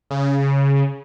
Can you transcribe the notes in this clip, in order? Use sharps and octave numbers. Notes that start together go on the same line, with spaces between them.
C#3